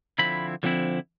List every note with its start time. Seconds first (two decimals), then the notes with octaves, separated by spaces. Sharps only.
0.18 D3 F3 C4 E4 B5
0.63 D3 F3 C4 E4